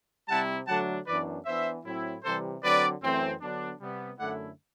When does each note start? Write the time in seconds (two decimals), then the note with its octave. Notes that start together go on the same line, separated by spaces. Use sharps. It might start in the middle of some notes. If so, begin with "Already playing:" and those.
0.28 C3 G3 C4 E4 F#5 A5
0.67 D3 F#3 A3 D4 F#5 A5
1.07 F#2 E3 B3 D4 B4 D5
1.45 E3 B3 D4 C5 E5
1.85 A2 F#3 C4 E4
2.24 C3 E3 G3 A4 C5
2.62 D3 F#3 C4 B4 D5
3.02 F#2 E3 A3 C4
3.41 D3 F#3 B3 D4
3.80 C3 G3 B3
4.19 F#2 D3 A3 E4 D5 F#5